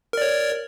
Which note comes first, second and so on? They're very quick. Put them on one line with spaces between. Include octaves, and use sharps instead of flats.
A#4 D5 C#5